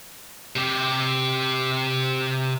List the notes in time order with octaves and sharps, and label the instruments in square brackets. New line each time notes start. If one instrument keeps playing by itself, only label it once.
[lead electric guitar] C3 G4